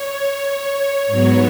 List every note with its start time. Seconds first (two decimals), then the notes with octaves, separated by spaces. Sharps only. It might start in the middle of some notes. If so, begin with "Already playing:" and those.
Already playing: C#5
1.07 G#2 F#3 B3